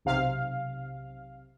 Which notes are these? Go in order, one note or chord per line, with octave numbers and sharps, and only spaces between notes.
B1 C3 F5